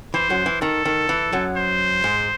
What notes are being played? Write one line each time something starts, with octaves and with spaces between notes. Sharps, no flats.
E3 C5
F#2 F#3
E3
D#3 A4
D#3
E3
F#2 F#3
C5
G#2 G#3